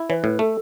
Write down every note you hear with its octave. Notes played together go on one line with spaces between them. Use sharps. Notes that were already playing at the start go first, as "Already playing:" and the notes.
Already playing: E4
E3 B4 C#5
A2
A3 A4